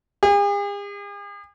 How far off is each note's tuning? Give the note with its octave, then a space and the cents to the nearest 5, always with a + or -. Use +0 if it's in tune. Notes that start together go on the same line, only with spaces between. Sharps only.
G#4 -45